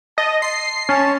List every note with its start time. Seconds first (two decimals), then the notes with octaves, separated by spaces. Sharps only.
0.18 D#5 A5
0.42 C6 C7
0.89 C#4 A5